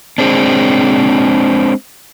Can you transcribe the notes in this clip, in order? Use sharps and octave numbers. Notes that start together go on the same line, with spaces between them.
G#3 C4 D4